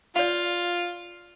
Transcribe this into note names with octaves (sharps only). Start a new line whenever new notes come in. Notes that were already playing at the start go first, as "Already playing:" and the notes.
F4 D5 F5